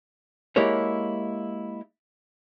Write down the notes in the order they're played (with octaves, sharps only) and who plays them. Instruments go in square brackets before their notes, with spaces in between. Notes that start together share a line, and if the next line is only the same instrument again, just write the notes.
[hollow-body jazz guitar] G#3 A#3 E4 G4 A#4 C#5